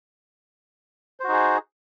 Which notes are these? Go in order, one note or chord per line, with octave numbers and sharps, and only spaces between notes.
D#4 F#4 G#4 C5